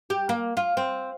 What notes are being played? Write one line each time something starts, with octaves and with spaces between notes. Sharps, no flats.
G4
A#3
F4
C4